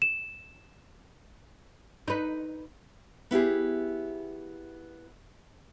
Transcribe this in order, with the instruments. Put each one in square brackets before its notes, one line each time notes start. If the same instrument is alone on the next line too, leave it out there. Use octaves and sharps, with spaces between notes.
[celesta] E7
[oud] D#4 B4
[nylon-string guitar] B3 E4 G4 G#4